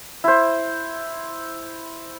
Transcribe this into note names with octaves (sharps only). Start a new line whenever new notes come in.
E4 C5